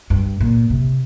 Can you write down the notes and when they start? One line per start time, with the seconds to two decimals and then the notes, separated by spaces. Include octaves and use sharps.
0.10 G2
0.40 A#2
0.70 C3